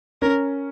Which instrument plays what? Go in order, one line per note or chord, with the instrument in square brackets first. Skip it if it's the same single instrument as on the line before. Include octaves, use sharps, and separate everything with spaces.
[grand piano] C#4 [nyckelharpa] A#4